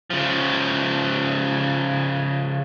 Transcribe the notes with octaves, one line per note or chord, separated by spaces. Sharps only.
C#3 F3